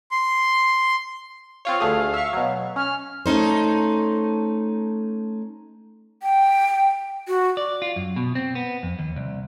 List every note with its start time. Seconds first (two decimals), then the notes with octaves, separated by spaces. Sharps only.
0.11 C6
1.65 C4 F4 C#5 F5
1.80 D2 A3 G#4
2.14 E5 C#6
2.33 B2 F#3
2.76 C#4 F6
3.26 A3 C#4 D#4 C5
6.23 G5
7.28 F#4
7.57 D5
7.82 F4
7.96 F#2
8.16 B2
8.35 C4
8.55 B3
8.83 F2
8.99 D#2
9.16 C2